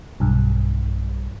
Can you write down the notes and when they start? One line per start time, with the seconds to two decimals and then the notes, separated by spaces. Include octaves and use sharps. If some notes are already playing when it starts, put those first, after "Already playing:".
0.20 B1 G2